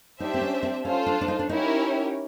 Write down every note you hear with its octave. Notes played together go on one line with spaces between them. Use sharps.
D4 D#4 G4 C5 E5
C4
C#4
C4
C#4 F4 A4 C5
D4
D4
D#4
D4
C#4 D#4 E4 G4 A#4 C#5